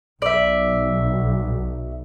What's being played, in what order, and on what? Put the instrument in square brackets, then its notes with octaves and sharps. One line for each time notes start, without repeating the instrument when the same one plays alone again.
[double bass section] B1 [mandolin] D5 E5